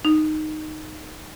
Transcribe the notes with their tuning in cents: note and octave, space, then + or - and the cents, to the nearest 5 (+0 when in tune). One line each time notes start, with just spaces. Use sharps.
D#4 -10